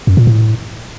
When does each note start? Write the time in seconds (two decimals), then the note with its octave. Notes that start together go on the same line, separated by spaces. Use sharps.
0.07 F#2
0.17 A#2
0.27 A2